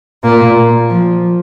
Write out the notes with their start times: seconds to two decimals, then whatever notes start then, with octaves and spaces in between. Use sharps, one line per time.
0.23 A#2 A#3
0.89 F3